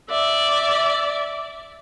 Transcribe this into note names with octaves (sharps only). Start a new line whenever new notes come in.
D5 E5